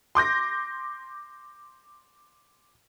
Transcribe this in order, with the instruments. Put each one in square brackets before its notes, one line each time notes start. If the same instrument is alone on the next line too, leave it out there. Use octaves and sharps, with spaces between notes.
[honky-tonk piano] C6 D6 G6 A#6